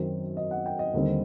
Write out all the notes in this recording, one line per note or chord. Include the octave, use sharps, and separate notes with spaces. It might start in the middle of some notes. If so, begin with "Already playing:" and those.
Already playing: F#2 D#3 F#3 C4
D#5
F#5
G5
D#5
D#2 D3 G3 C4